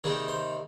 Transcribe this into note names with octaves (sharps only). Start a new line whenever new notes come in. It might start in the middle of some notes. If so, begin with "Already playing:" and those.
C3 D#3 G3 A#3 D#4 G#4
C5